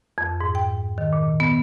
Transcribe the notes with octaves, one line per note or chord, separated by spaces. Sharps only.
F2
G#2
G5
D#3
A#2
B3